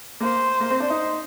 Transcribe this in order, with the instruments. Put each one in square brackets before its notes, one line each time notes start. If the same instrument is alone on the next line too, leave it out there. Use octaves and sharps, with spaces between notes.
[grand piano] A#3 [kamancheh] C5
[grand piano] A#3
C4
D4
D#4